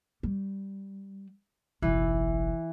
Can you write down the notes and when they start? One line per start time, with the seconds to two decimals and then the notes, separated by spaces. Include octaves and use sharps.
0.23 G3
1.82 F#1 B1 E3